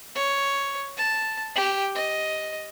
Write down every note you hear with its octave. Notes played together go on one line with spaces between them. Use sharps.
C#5
A5
G4
D#5